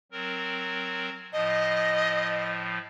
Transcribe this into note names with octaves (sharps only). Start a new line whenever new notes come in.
F#3 C4 A#4
A2 F3 D#5